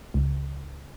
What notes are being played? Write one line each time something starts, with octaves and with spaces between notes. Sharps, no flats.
C#2